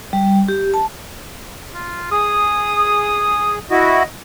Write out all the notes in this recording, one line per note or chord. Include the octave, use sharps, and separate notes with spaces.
G3
G4
A5
F4
G#4 D#6
E4 F#4 D#5